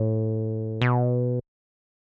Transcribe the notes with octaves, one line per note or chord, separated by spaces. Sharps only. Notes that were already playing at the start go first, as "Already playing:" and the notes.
Already playing: A2
B2